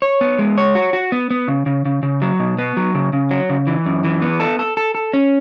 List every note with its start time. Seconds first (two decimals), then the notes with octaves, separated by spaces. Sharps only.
0.02 C#5
0.21 B3
0.39 G#3
0.58 C#5
0.75 F#4
0.93 F#4
1.12 B3
1.31 B3
1.48 C#3
1.66 C#3
1.85 C#3
2.03 C#3
2.22 F#3
2.40 B2
2.58 B3
2.77 F#3
2.95 C#3
3.13 C#3
3.31 F#3
3.50 C#3
3.67 E3
3.86 F#2
4.04 E3
4.22 B3
4.40 A4
4.59 A4
4.77 A4
4.95 A4
5.13 C#4